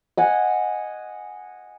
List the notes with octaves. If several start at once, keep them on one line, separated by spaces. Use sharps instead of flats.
D#5 F#5 G#5